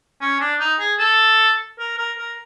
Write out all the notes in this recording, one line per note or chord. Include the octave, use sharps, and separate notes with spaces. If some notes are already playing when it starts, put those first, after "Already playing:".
C#4
D4
D#4
G#4
A4
A#4
A#4
A#4